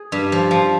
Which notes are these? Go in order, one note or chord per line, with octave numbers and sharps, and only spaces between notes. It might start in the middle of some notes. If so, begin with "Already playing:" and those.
Already playing: G#4
G2
F3
F3